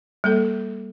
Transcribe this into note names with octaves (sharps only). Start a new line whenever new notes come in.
G3 A#3 A4